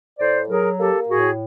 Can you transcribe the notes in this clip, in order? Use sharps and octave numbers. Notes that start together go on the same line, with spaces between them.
A2 C5 D5
F#3 G#4 A#4
A#3 G4 A4
A2 F#4 G#4